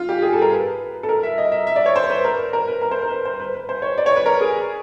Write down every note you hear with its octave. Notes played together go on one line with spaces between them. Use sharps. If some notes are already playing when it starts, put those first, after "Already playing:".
Already playing: F4
G4
G#4
A4
A#4
B4
A4
A#4
E5
D#5
E5
E5
D5
C#5
C5
B4
A#4
A#4
B4
A#4
C5
A#4
B4
C5
B4
B4
C5
C#5
D5
C#5
B4
A#4
G#4